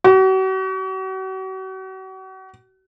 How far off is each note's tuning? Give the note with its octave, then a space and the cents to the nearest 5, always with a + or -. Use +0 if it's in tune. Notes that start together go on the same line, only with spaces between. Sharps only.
F#4 +40